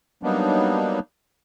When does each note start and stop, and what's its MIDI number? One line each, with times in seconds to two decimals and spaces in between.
0.23 0.99 54
0.23 0.99 55
0.23 0.99 58
0.23 0.99 59
0.23 0.99 62
0.23 0.99 63